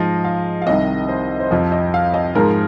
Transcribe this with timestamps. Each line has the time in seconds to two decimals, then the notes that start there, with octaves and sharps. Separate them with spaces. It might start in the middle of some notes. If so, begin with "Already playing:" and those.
Already playing: G#2 F3 D#5
0.24 F5
0.62 F5
0.66 C2 C3 D#3 D#5
1.09 C5
1.40 C5
1.51 F2 F3 D#5
1.72 D#5
1.94 F5
2.14 D#5
2.35 G#2 F3 A#4